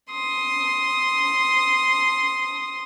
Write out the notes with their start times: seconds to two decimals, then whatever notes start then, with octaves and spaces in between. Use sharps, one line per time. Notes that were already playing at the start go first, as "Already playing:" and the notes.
0.12 C6 D#6